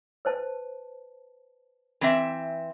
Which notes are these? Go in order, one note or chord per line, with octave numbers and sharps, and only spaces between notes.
B4 C5 A5
E3 C4 E5